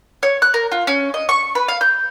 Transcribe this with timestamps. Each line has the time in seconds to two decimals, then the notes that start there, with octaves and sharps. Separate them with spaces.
0.23 C#5
0.42 F#6
0.54 A#4
0.72 F4
0.87 C#4
1.14 D#5
1.29 C#6
1.55 B4
1.68 F5
1.81 G6